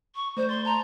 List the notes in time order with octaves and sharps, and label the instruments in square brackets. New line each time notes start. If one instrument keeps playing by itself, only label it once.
[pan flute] C#6
[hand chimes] A3 D5 G6 [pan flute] C5
[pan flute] C6 [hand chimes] A6
[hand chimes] A5 G6 [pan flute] A#5